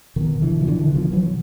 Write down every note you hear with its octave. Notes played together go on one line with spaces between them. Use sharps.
B2 D#3
D3 E3
F3
D3 E3
E3
B2 D#3 F3
E3 F#3